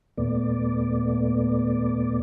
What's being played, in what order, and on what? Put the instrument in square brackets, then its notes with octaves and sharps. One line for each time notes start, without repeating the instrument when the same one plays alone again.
[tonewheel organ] D#2 A#2 A3 B3 D5